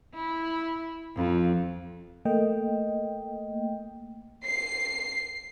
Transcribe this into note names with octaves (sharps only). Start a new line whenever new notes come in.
E4
F2
A3 A#3 D#5 G5
C7